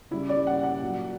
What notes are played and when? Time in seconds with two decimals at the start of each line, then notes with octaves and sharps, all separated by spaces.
0.11 C#3 G3 E4
0.29 D5
0.47 F#5
0.64 F#5
0.81 A#2 F#3